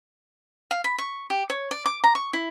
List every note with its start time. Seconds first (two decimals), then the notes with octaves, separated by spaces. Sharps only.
0.71 F5
0.84 B5
0.98 C#6
1.30 G4
1.50 C#5
1.71 D5
1.86 D6
2.04 A#5
2.15 C#6
2.33 E4